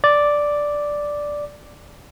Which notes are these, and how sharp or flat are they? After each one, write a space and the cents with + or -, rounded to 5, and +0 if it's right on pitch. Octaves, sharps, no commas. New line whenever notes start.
D5 +0